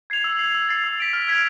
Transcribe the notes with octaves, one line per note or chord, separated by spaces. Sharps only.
G#6 C7 F7
E6
G#6 C7
E6
A6 C7
E6
B6 D7 F7
F6
G#6 B6 D7 F7